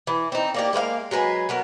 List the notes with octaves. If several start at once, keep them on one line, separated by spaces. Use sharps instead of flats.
E3
C4 D#4
A#3 D4 G4
G#3 A#3 B4 F5
F#3 G#3 B4 G#5
F#3 B3 A#4